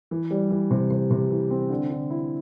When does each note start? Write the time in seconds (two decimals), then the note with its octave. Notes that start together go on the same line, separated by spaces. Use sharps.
0.11 E3
0.31 G3
0.50 E3
0.71 C3
0.90 C3
1.11 C3
1.30 E3
1.50 C4
1.70 D3
1.90 D3
2.10 E4